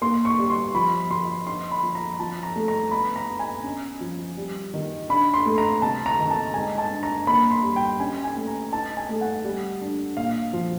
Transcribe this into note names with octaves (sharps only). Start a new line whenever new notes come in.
A#3 C6
C#6
G3
C6
F3 B5
F3 C6
D#4 C6
B5
F3
A#5
F3 A5
A#5
A3
A#5
B3 B5
A#5
B3
G#5
C#4
F3
G3
D#3
D4 B5
C6
A3
A#5
C3 A5
A#5
D#3
A5
G#3 G#5
A5
D4
A#5
A#3 B5
C6
G3
G5
C#4 G#5
G#5
A3
A#5
D#4 A5
G#5
A3
F#5
G3
D4
A#2 F5
F3